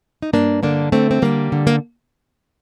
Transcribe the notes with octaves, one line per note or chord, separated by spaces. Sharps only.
D#4
G2 A#3 D4
D3 A#3 D4
D3 A3 C4
C4
D3 G3 A#3
D3
A#3